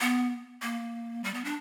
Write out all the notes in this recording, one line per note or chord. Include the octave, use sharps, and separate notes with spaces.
B3
A#3
G3
B3
D4